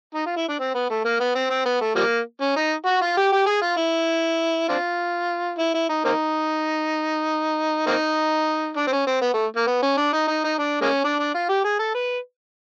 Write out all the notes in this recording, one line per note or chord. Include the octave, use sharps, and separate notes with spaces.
D#4
F4
E4
D4
C4
B3
A3
A#3
B3
C4
C4
B3
A3
F3 G3 A#3
C#4
D#4
F#4
F4
G4
G4
G#4
F4
E4
C4 D4 F4
E4
E4
D#4
A#3 C4 D#4
A#3 C4 D#4
D4
C4
C#4
C4
B3
A3
A#3
B3
C#4
D4
D#4
D#4
D#4
D4
G#3 A#3 C#4
D4
D4
F4
G4
G#4
A4
B4